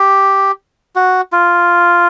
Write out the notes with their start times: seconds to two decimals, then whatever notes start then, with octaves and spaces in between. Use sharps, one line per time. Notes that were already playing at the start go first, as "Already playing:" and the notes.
Already playing: G4
0.96 F#4
1.32 F4